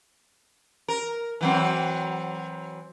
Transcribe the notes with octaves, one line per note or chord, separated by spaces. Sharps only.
A#4
E3 F#3 C4